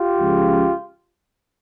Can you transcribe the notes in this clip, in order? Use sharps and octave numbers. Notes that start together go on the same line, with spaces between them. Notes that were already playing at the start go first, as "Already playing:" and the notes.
Already playing: F4 G4
C#2 C#3 F3